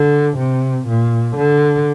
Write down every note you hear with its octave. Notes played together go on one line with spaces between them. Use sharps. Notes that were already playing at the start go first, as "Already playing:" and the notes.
Already playing: D3
C3
A#2
D3